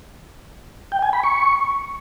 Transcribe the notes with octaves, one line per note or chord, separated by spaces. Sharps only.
G5
G#5
B5
C#6